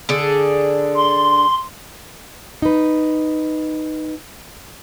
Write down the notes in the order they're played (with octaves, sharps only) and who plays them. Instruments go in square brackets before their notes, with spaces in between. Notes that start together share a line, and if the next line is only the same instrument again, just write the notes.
[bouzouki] D3 D4 G#4
[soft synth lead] C6
[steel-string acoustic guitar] D#4 B4